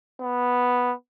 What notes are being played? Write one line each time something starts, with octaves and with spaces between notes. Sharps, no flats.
B3